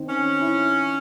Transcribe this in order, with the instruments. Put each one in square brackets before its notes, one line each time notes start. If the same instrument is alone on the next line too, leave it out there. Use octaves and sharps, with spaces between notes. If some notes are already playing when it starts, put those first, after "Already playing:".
Already playing: [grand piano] D#3 C4
[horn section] C#4
[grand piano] E4